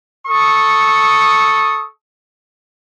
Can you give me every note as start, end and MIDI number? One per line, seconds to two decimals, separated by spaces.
0.28 1.88 69
0.28 1.88 85
0.28 1.88 87